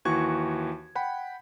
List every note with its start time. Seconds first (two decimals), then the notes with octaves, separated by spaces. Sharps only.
0.05 D#2 E3 F#4 C#6 G#6
0.95 F#5 G5 B5